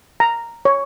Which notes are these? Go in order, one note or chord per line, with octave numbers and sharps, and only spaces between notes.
A#5
C#5